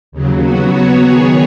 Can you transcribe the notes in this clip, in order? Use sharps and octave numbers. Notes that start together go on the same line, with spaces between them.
D#2 C#3 F#3
F#3 B3 F#4
F#3 B3 F#4 C#5
D#3 B3 G#4 C#5